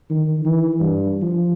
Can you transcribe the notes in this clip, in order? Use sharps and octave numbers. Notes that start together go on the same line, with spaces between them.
D#3
E3
G2
F3